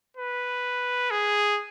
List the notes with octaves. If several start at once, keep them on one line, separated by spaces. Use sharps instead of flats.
B4
G#4